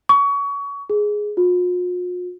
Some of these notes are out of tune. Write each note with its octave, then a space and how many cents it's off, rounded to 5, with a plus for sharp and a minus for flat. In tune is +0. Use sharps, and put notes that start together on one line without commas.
C#6 +30
G#4 +5
F4 +45